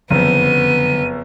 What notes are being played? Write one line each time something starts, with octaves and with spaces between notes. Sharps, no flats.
F#1 F2 D3 F#3 G3 B3 D#7